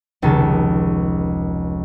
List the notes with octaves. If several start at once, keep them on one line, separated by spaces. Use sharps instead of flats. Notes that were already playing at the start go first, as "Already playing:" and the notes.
F1 C#2 D#3 A5